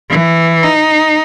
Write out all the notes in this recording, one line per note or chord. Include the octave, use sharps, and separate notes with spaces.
E3
D#4